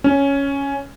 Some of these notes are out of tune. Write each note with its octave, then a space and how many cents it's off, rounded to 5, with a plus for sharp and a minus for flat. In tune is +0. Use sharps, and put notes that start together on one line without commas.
C#4 +5